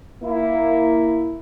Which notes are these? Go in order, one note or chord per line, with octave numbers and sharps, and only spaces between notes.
A#3 E4